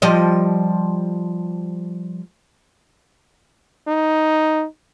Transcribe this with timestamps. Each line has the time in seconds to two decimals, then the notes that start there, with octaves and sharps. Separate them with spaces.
0.02 F3 G3 D#5
3.87 D#4